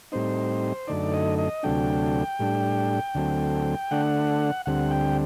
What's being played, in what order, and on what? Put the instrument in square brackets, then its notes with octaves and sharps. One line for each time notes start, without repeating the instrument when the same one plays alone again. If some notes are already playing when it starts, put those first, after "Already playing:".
[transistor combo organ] A2 G3 C4 D#4 C5
F#2 D3 A3 D#4 D5
D#5
D#5
D2 C3 F#3 A3 D4 G5
A2 G3 D4
D2 D3 F#3 A3 C4
D3 A3 D4 F#5
D2 D3 G3 C4 F#5
G5